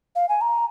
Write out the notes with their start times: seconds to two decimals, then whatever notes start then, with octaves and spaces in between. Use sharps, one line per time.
0.16 F5
0.29 G#5
0.41 A#5